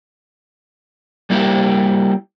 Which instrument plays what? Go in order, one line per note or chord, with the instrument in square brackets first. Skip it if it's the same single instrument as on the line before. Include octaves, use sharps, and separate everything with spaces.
[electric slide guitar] G3 A#3 E4 G4